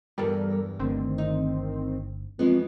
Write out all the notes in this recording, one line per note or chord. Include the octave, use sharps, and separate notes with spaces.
E2 G2 G3 A4 A#4
G1 D3 D#3 A3 C4
D#4
F2 E3 G#3 B3